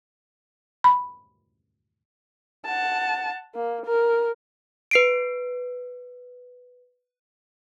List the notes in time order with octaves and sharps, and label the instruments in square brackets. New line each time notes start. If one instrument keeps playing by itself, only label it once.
[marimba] B5
[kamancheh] F#5 A5
A#3
A#4
[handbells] B4 C7 D7